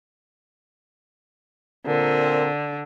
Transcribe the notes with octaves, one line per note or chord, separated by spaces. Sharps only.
A#2 D3 C4 A#4